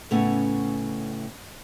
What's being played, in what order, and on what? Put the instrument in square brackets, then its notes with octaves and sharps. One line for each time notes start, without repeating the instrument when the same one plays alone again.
[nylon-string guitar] A2 C#3 A3 B3 C#4 F#5